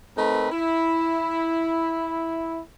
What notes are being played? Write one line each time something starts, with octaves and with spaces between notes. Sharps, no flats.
A3 C4 D#4 A#4 B4
E4